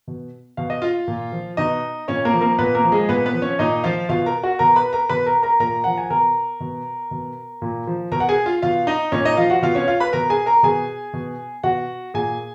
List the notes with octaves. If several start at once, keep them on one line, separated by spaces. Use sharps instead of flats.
B2
B2 F5
D#5
F4 F5
A#2
F3
B2 D#4 D#5
A#2 C#4 C#5
A#3 A#4
F3
A#3 A#4
A#2 B3 B4
A#3 A#4
F3
G#3 G#4
A#2 B3 B4
B3 B4
F3
C#4 C#5
A#2 D#4 D#5
F3 F4 F5
B2 F4 F5
A#4 A#5
F#4 F#5
B2 A#4 A#5
B4 B5
A#4 A#5
B2 B4 B5
A#4 A#5
A#4 A#5
A#2 A#4 A#5
F3 F#5
G#5
B2 A#4 A#5
B2
B2
A#2
F3
B2 A#4 A#5
F#5
G#4 G#5
F4 F5
B2 F4 F5
D#4 D#5
A#2 C#4 C#5
D#4 D#5
F3 F4 F5
F#4 F#5
B2 F4 F5
C#4 C#5
F4 F5
B4 B5
B2 A#4 A#5
G#4 G#5
A#4 A#5
B2 G#4 G#5
B2
B2 F#4 F#5
A#2 G#4 G#5